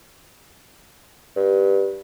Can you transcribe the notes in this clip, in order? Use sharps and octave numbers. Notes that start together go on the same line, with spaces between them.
G2